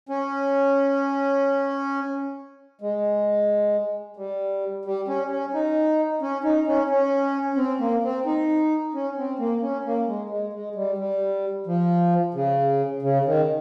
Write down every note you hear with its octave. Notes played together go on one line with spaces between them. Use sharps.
C#4
G#3
G3
G3
C#4
C#4
D#4
C#4
D#4
C#4
C#4
C#4
C4
A#3
C4
D#4
C#4
C4
A#3
C#4
A#3
G#3
G#3
G#3
G3
G3
F3
C#3
C#3
D#3